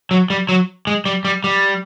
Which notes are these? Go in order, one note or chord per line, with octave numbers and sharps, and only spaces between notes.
F#3
G3
F#3
G#3
G3
G3
G3